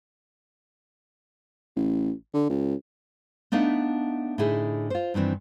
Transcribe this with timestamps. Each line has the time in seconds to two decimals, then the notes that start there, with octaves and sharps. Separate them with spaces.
1.76 A1
2.34 D3
2.49 C#2
3.52 A3 B3 D4 D#4 E5 F5
4.38 A2 D3 D#4 E4 G#4
4.90 F4 C5
5.14 G2 D#3 E3 C4 D4